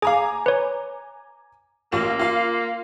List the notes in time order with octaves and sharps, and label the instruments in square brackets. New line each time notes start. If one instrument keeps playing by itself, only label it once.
[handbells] G#4 F5 [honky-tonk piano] G#5 A#5 D6
[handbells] B4 C#5
[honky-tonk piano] A1 F4 E7 [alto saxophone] A#3
[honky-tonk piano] F4 F5